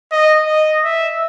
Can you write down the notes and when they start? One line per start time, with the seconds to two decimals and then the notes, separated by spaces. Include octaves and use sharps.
0.11 D#5
0.47 D#5
0.84 E5